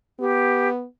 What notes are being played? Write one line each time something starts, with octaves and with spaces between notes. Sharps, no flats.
B3 G4